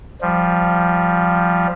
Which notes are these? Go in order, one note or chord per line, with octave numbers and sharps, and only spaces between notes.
F3 G3